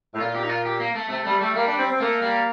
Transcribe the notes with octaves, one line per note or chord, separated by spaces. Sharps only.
A2
A#2 F4
G4
D#4
F4
G4
A#3
A3
C3 A3
G3 A3
G3 A3
G3 A#3
D4
C4
C4
A3 A#3
G3